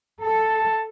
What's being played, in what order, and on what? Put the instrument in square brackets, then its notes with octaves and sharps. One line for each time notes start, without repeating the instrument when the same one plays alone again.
[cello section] A4 [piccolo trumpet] A5